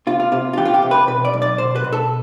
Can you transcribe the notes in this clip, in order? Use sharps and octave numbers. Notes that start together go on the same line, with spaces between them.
C3 F4
F4
C3 F4
F4
E3 G4
F4
G4
C3
B4
B2 B4
D5
B1
D5
B2 C5
B4
B2
A4